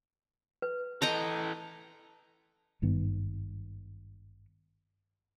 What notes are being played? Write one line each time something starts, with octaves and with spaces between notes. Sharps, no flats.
B4
E3 A4 D#5 G5 A#5
G#1 G2 D#3 B3